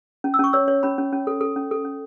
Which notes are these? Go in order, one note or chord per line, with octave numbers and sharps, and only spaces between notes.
C#4
E6
C#4 C#6
C#5 E6
C#5
C#4 B5
C#4
C#4
A4
A4
C#4
A4
C#4